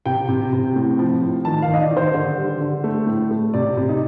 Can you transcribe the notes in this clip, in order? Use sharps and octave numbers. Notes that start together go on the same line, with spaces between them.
C3 G5
C3
C3
A2
F3
A2
D#3 A5
F5
D#3
D#5
D5
D#3
C5
D3
G3
D3
A3
A2
A3
C3 D5
C3
D#4